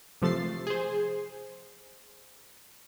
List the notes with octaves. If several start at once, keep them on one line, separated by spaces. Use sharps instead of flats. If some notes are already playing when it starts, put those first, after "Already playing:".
C3 F3 A3 A6 C7
G#4 C5